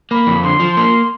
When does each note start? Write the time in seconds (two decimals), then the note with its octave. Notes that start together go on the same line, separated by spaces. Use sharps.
0.11 A#3 B5
0.27 F2
0.43 D3 C6
0.60 F3
0.77 A#3 C6